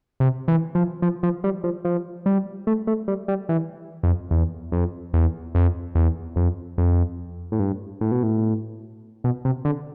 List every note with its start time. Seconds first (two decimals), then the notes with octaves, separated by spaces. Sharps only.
0.20 C3
0.48 E3
0.75 F3
1.02 F3
1.23 F3
1.44 G3
1.64 F3
1.85 F3
2.26 G3
2.67 A3
2.87 A3
3.08 G3
3.28 G3
3.49 E3
4.03 F2
4.31 E2
4.72 F2
5.14 E2
5.55 F2
5.95 E2
6.36 F2
6.78 F2
7.52 A2
7.59 G2
8.01 A2
8.12 B2
8.23 A2
9.24 B2
9.45 C3
9.65 D3